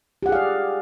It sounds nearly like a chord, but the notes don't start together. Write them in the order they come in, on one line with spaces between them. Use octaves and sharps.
G4 F#5 G#4 F5 D5